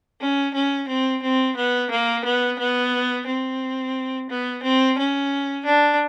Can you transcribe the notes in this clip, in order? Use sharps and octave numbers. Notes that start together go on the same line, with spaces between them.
C#4
C#4
C4
C4
B3
A#3
B3
B3
C4
B3
C4
C#4
D4